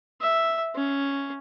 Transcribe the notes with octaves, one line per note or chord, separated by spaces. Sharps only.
E5
C#4